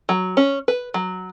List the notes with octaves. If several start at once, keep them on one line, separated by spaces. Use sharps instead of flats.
F#3
C#4
B4
F#3